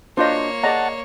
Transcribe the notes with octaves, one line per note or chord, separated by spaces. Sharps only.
A#3 D4 F4 F#4 C5 C#5 D#5
G#4 D5 D#5 F#5 A5 A#5